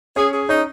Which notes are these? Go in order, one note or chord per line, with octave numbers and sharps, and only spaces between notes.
C#4 G#4 C#5
G#4
C#4 D#4 C#5